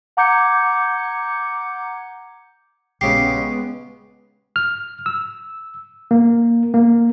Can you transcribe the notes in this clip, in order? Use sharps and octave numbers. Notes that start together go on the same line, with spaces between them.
F#5 A#5 D6 G6 G#6 C#7
A#1 C#3 G#3 B3 G4 C7
F6
E6
A#3
A#3